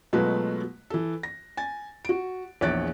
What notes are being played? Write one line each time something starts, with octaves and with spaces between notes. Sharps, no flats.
B2 F#3 G#3 A3 F4 B4
E3 A4
A#6
G#5 A6
F#4 D7
A#1 E2 C#5 F#6 A6 D7